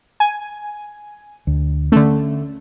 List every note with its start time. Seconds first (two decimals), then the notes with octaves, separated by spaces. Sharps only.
0.20 G#5
1.47 D2
1.92 D3 A3 C#4